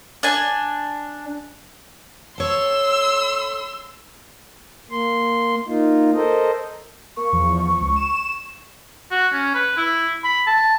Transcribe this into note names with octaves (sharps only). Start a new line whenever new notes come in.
D4 G#5
A4 C#5 C6 E6
A#3 C6
A#3 D#4 F4
A4 A#4 C5 D#5
A#3 C#6
E2 F3
C#2
E7
F#4
C#4
B4
E4
B5
A5